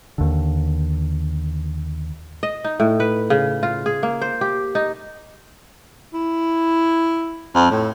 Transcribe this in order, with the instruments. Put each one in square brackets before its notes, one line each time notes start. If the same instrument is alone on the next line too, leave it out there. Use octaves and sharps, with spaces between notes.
[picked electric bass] D#2 D3
[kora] D#5
D#4
A2
B4
C#3
F4
G#4
A#3
C5
G4
D#4
[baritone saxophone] E4
F2
A2